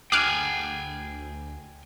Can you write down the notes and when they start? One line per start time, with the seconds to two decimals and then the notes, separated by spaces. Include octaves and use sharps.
0.12 D2 E4 G#4 G5 G#5 D6 F6 F#6